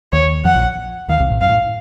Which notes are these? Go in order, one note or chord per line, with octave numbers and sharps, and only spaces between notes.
D#2 D#3 C#5
F2 F3 F#5
A#1 A#2
D#2 D#3 F5
C2 C3
A1 A2
F#2 F5
A2